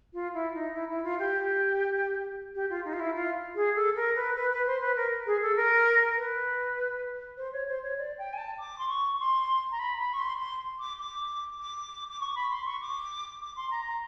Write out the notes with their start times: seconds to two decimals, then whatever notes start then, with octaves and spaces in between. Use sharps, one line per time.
0.13 F4
0.33 E4
0.53 D#4
0.73 E4
0.89 E4
1.03 F4
1.18 G4
2.54 G4
2.70 F4
2.84 D#4
2.93 F4
2.99 E4
3.15 F4
3.55 G#4
3.75 A4
3.96 A#4
4.15 B4
4.35 B4
4.51 B4
4.66 C5
4.81 B4
4.96 A#4
5.26 G#4
5.41 A4
5.56 A#4
6.17 B4
7.37 C5
7.52 C#5
7.67 C5
7.83 C#5
7.98 D5
8.18 G5
8.33 G#5
8.37 A5
8.58 D6
8.78 C6
8.88 C#6
9.19 C6
9.71 A#5
9.79 B5
9.99 B5
10.13 C#6
10.19 C6
10.39 C6
10.79 D6
10.99 D6
11.60 D6
12.09 D6
12.20 C#6
12.35 B5
12.50 C6
12.65 C#6
12.81 D6
13.41 D6
13.56 C6
13.70 A#5
13.86 A#5